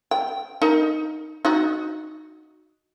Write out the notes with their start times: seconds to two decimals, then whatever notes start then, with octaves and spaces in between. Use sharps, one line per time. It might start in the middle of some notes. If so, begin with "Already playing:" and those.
0.11 G5
0.62 D#4 A#4
1.45 D#4 F#4